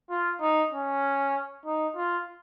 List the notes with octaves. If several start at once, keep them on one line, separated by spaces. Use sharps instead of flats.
F4
D#4
C#4
D#4
F4